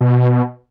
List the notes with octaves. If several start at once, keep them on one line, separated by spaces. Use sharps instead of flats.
B2